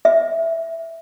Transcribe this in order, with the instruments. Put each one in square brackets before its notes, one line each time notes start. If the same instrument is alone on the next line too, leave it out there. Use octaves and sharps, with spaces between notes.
[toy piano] E5